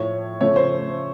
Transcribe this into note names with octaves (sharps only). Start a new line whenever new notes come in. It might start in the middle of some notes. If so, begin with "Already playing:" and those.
Already playing: A2 F3 A3 C#5
C#3 F3 A3 C#5
C5